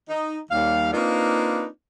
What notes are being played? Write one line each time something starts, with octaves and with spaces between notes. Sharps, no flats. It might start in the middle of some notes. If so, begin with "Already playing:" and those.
D#4
D#2 G3 F5
A#3 C4 D4 D#4 F4 B4